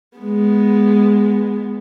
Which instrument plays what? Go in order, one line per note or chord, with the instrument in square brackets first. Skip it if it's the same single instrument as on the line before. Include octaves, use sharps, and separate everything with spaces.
[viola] G#3 B3